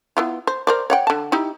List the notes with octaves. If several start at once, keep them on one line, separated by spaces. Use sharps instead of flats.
B3 E4 F4
C5
A#4 C5 D5
C#5 F#5 G5
D3 A5
D#4 E4 G4